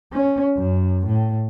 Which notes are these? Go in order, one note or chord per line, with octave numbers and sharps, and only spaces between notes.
C#4
F#2
A2